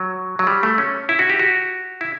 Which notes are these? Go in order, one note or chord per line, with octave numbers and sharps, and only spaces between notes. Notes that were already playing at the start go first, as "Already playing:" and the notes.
Already playing: F#3
F#3
G3
A3
C#4
E4
F#4
G4
F#4
E4